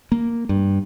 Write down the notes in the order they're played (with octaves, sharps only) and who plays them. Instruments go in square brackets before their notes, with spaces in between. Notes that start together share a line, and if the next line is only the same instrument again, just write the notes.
[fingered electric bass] A#3
G2